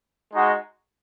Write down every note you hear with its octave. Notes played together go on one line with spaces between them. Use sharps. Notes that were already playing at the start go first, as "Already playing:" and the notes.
G#3 D#4 F#4